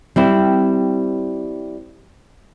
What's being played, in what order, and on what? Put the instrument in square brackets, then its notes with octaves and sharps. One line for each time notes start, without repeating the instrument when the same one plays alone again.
[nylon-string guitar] G3 C4 E4